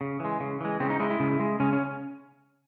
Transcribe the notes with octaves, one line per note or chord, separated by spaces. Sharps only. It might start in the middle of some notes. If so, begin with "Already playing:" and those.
C#3
E3 G#3
C#3
E3 G#3
C#3 C4
D#4
G#3 E4
E4
C#3
G#3
C#3 C#4
C#4